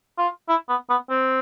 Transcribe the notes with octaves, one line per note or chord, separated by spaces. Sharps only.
F4
E4
B3
B3
C4